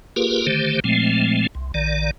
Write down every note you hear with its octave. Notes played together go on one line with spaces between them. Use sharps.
A#3 F4 G4 G#4 A#4 B4
D3 D#3 A3 G4 C5
A#2 F3 G#3 A3 C4
C2
A#1 D#3 D5